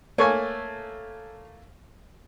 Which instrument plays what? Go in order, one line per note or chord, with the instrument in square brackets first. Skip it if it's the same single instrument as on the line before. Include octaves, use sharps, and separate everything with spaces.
[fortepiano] A3 A#3 G#5 [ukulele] C#5